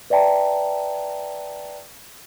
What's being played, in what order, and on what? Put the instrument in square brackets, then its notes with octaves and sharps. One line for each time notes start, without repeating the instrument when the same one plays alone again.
[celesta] B4 D5 E5 G5 A5 A#5